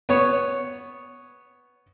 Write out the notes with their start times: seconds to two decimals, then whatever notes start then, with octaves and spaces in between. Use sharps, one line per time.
0.09 B3 C#5